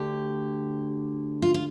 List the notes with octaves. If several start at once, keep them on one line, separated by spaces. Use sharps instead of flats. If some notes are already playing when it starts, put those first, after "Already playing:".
Already playing: D2 D3 G4
F4
F4